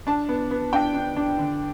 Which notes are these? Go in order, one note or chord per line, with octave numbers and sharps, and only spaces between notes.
D4 A5
B3
B3
D4 G5
D4
D4
D3